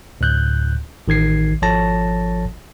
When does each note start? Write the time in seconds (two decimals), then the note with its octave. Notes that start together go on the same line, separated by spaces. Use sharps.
0.21 D2 A2 F#6 G6
1.08 A1 D#3 G#6 C7
1.62 G#1 F3 A4 C#5 A5 A#6